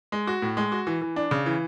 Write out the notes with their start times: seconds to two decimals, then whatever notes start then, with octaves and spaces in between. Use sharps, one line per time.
0.12 G#3
0.27 F#4
0.42 A2
0.57 G#3
0.72 F#4
0.87 E3
1.02 E3
1.16 D4
1.31 C#3
1.46 E3